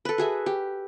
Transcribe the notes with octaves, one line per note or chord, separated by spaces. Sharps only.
A4 B4
F#4 G#4 E5
G4